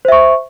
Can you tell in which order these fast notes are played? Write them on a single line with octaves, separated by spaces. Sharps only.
C5 E5 C#6